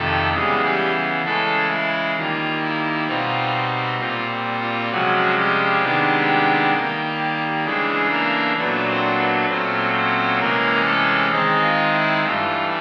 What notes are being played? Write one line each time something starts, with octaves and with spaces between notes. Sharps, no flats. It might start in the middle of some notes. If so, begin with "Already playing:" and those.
Already playing: F2 C3 D#3 A3 A4
C#3 E3 G3 G#3 B3 G#4
G3 G4
C#3 E3 G#3 A3 A4
E4
D#3 G3 A#3 F4
E4
B2 G3 C4 D#4 F4
A#2 G3 C4 F4
F4
C3 F3 F#3 G#3 C#4 F#4
G3 G4
C3 D#3 G#3 B3 D4
D#3 G3 A#3
C#3 E3 G#3 A3 D4 G#4
A#3 A#4
A#2 F#3 A3 B3 D4 B4
C4 C5
B3 B4
A#2 F#3 A3 C4 C#4 C5
C4 C5
C3 E3 G#3 A#3 C#4 A#4
A3 A4
D#3 G#3 C4 D#4 G#4
F4
E4
G2 E3 A3 F4